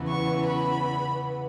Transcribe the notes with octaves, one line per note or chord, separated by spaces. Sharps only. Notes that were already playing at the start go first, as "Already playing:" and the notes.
Already playing: E2 C#3 E3 B3
C#6
B5